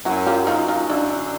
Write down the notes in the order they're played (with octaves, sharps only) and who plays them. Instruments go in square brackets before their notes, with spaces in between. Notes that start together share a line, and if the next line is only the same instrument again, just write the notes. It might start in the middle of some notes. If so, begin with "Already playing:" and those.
[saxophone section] F#2 [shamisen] E4 F#4
[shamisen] F4 G4
[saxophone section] F#2 [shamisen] D#4 F4
[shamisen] D#4 F4
[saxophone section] D3 [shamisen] D4 E4